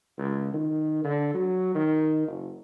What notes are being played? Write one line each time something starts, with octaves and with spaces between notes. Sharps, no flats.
C#2
D#3
D3
F#3
D#3
F#1